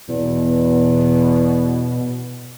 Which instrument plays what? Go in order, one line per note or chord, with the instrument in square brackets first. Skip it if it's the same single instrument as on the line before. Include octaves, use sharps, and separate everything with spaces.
[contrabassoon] E2 [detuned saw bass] B2